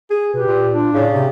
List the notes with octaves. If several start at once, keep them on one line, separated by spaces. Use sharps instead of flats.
G#4
B2 G4 B4
A#2
D4 F4
A2 C#3 D5
C3 G4